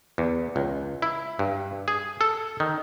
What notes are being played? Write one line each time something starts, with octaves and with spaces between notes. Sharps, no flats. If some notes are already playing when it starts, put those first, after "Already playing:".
E2
C#2
E4
G2
G#4
A4
D#3